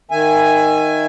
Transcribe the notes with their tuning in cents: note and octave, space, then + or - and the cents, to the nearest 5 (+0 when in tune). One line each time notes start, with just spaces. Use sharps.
D#3 +0 E5 +20 G#5 -5